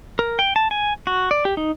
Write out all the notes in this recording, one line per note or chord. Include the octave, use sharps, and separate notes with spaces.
A#4
G5
A5
G#5
F#4
D5
G4
D#4